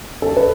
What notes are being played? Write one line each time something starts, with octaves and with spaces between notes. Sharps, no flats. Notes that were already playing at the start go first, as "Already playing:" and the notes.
A4
B4